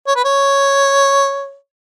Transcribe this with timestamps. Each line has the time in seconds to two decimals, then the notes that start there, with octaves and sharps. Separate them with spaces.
0.07 C#5
0.16 B4
0.24 C#5